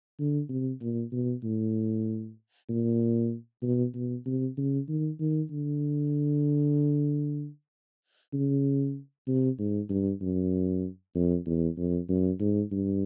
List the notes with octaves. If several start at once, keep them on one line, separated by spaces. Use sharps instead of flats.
D3
C3
A#2
B2
A2
A#2
B2
B2
C3
C#3
D#3
D#3
D3
C#3
C3
G#2
G2
F#2
F2
E2
F2
F#2
G#2
G2